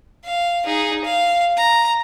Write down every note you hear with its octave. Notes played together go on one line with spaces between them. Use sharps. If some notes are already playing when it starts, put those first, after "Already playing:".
F5
D#4 G#4
F5
A#5